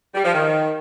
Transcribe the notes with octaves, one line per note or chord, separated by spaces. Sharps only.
G3
F3
D#3